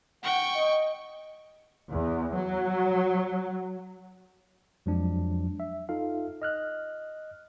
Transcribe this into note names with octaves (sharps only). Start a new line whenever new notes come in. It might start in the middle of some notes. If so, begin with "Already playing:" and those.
F#5 G5 C#6
D#5
E2
F#3
F2 F3 F#3 G#3 D4
E5
D#4 F4 A4 F5
D#5 F6 F#6